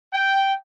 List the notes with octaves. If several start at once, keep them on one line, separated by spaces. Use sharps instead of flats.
G5